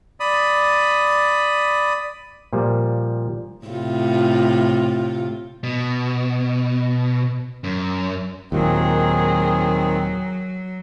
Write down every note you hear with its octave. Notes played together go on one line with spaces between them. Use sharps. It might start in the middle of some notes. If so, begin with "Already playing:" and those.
D5 B5 D#6
A#2 F3 G3
A2 C3 F4
B2
F#2
D#2 A#2 D#3 F#3 C4 G#4 A#4